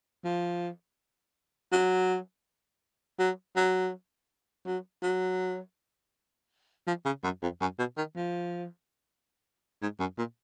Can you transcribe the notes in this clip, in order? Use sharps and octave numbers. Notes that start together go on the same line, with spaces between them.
F3
F#3
F#3
F#3
F#3
F#3
F3
C#3
F#2
F2
F#2
B2
D#3
F3
G#2
F#2
A#2